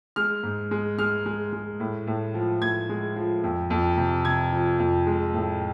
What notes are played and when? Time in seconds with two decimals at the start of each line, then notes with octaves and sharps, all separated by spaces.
0.16 G#3 F6
0.43 G#2
0.71 G#3
0.98 G#3 F6
1.26 G#3
1.53 G#3
1.80 A2
2.07 A2
2.34 F3
2.62 A2 G#6
2.89 G#3
3.16 F3
3.44 F2
3.70 F2
3.97 C3
4.25 C3 G#6
4.52 F3
4.79 F2
5.07 G#3
5.34 A2